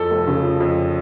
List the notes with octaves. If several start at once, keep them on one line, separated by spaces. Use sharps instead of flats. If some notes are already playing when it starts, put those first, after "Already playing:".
Already playing: F2 A4
F1
C#3
F3
F2